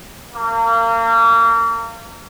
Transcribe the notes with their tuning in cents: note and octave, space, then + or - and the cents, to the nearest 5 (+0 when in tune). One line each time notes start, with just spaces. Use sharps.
A#3 -30